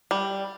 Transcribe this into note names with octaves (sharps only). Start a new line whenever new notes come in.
G3